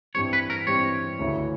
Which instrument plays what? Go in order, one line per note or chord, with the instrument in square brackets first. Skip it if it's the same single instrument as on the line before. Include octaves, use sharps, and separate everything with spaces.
[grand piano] G2 E3 G3 C4 [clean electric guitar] C#5
[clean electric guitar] B4
A#4
[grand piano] G2 E3 G3 C4 [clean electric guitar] C#5
[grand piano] D2 C#3 E3